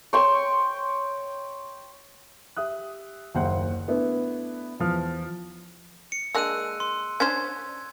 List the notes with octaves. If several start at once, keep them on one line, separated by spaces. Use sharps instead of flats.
C#5 G5 C6 C#6
G4 E5 D#6 F#6
F#1 D#2 C5 F#5 G5 F#6
A3 B3 D4 E4 B4
E2 F3 F6
C#7
G#3 A#3 D4 E6 F#6 D#7
C6
C#4 D4 C5 G#6